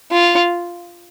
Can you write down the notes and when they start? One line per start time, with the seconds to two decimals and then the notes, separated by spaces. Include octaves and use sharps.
0.12 F4